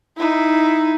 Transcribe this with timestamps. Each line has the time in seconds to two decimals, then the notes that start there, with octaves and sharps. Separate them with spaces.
0.17 D#4 E4